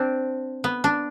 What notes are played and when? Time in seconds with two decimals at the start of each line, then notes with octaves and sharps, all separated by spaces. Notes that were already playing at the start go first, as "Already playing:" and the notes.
Already playing: C4 D4
0.64 B3
0.84 D4